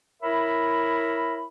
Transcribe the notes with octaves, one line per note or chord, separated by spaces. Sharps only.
E4 A#4 C#5 E5 B5